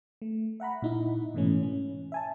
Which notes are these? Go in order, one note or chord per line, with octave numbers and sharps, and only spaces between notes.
A3
E5 F#5 A#5 B5
A#2 D#4 E4
G#2 B2 E3 A3 C#4
C#4
E5 G#5 A5